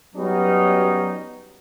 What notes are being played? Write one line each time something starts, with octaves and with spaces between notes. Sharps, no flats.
F#3 G3 B3 C#4 D#4